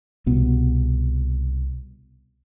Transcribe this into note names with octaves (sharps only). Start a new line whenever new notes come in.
C2 B2 B3